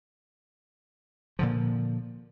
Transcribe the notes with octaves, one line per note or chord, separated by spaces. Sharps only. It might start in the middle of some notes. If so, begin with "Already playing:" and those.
A#2 D3 F3